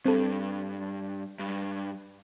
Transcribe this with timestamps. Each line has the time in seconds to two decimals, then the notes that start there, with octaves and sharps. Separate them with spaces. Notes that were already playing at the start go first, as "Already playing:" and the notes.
0.05 G2 C4 A4
1.39 G2